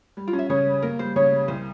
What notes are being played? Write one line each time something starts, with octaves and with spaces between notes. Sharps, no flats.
G3
F4
C#4
E5
C#3 C#5
G3
A#3 A#4
G3 C5
C#3 C#5
G3
C2 C5